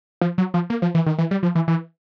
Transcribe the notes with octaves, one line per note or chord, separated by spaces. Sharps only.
F3
F#3
F3
A#3
F3
E3
D#3
E3
G3
F3
E3
E3